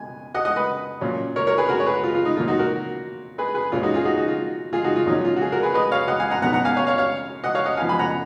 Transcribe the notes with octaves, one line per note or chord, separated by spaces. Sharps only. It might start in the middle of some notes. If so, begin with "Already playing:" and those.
Already playing: B2 G#5
D#5 F#5
D#5 F#5
B4 D#5
A#2 F#3 C#4
A#4 C#5
A#4 C#5
G#4 B4
F#4 A#4
C#5
G#4 B4
F4
F4
D#4
A#2 F#3 A#3 F4
D#4 F#4
F#4 A#4
G#4 B4
G#4 B4
A#2 G#3 C#4 F4
D#4 F#4
F4 G#4
D#4 F#4
D#4 F#4
F4
F4 G#4
D#4 F#4
F4
A#2 F#3 C#4 D#4
F4
F#4
F4 G#4
F#4 A#4
G#4 B4
B4 D#5
C#5 F5
D#5 F#5
F5 G#5
F#5 A#5
B2 F#3 B3 D#4 F#5 A#5
F#5 A#5
F5 G#5
C#5 F5
C#5 F5
C#5 F5
D#5 F#5
C#5 F5
D#5 F#5
F3 B3 D#4 F5 G#5
G#5 B5
F#5 A#5